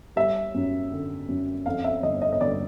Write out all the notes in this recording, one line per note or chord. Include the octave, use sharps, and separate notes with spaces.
G3 E5
F#2
D3
F#2
F2 F5
E5
G1 D#5
D#5
D#5
G1 D5